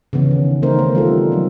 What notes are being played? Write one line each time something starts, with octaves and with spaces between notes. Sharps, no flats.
C#3 E3 B3 C#4
D#3
D#3 A3 C4 D#4 A#4 C5
A3 B3
G3 F4 A4
F#3 D#4